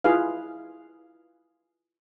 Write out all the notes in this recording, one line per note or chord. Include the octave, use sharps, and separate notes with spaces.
E4 F4 G#4 B4 F5